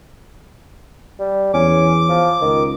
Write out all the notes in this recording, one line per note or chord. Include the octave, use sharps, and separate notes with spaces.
G3
E2 C#4 D6
F3
C#2 D#3